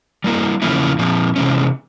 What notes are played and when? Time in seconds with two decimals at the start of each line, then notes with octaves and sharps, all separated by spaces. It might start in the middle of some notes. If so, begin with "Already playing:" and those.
0.24 G3 A#3 E4 A#4
0.62 E2 C#3 F3 A#3 E4
0.99 A#2 F3 C4
1.36 C3 E3 G#3 C#4